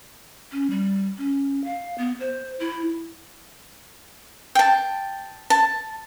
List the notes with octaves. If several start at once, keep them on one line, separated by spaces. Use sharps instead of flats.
C#4
G3
C#4
F5
B3
C5
E4
G5 A5
A5